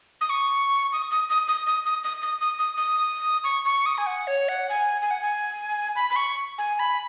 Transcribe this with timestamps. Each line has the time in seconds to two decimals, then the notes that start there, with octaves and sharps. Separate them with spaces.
0.21 D#6
0.30 C#6
0.93 D#6
1.11 D#6
1.29 D#6
1.48 D#6
1.66 D#6
1.85 D#6
2.04 D#6
2.22 D#6
2.41 D#6
2.59 D#6
2.77 D#6
3.44 C#6
3.65 C#6
3.86 D#6
3.98 G#5
4.07 F#5
4.27 C#5
4.49 F#5
4.70 G#5
5.02 G#5
5.11 F#5
5.22 G#5
5.96 B5
6.10 B5
6.16 C#6
6.58 G#5
6.79 B5